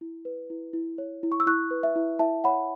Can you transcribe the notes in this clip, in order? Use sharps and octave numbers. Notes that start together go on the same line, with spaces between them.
E4
B4
E4
E4
C#5
E4
C#6
E6
E4 C#6 F#6
B4
E5
E4
E4 E5 A5
C#5 F#5 B5